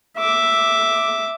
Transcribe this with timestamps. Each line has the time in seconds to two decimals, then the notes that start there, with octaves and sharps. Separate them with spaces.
0.18 E5 D6